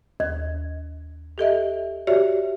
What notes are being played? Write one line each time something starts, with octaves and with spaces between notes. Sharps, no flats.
D#2 G#6
G4 A4 D#5 E5
F#4 G4 C#5 D5 E5